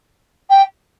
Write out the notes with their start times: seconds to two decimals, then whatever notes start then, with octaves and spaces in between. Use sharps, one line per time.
0.50 G5